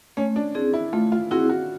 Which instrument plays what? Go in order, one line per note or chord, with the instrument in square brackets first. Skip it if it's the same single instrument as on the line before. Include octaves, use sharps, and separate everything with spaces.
[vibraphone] A3 [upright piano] C#4
[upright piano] D4
[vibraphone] C4 E4 G#4 [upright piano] D4
[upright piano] E4
[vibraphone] A3 [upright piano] F4
[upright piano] F4
[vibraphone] C4 E4 G#4 [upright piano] F#4
[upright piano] F#4